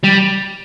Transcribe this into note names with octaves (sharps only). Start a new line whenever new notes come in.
G3